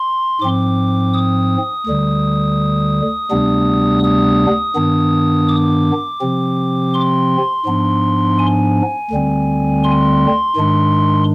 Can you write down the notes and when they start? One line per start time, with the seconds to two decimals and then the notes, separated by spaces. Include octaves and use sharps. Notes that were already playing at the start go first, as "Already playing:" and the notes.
Already playing: C6
0.41 G#2 F3 C4 D6
1.13 D#6
1.87 D2 D3 G3
3.31 D2 C3 G3 B3 D4
4.03 D#6
4.75 G2 D#3 B3 D4
5.48 D6
6.21 C3 F3 C4
6.94 C6
7.65 G#2 F3 B3 D4
8.39 G#5
9.11 D2 D3 G3 C4
9.84 C6
10.56 G#2 D#3 G#3 D4